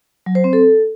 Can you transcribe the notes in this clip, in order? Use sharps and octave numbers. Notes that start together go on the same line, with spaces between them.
F#3
C5
C4
A4